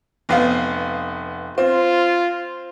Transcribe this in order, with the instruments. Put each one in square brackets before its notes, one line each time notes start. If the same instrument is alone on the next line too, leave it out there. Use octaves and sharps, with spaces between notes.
[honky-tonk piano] F1 B3 F5
[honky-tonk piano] C4 [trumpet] F4